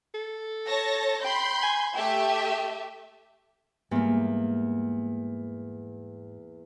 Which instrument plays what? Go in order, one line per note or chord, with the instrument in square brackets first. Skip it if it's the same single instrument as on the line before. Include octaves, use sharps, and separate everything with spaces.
[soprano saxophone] A4
[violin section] C#5 A5 A#6
[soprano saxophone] G5 [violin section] B5 C6 G6
[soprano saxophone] G#5
[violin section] A3 G4 E5 [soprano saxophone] G5
[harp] E2 A#3 [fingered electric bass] G#2 G3